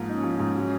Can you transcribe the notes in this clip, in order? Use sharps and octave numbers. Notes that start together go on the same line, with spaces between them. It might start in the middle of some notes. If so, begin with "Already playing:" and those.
Already playing: G#2 F3 A#3
C#4 D#4
F3
G#2
F#3